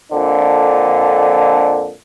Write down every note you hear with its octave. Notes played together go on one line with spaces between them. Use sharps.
F2 A#2 D3 D4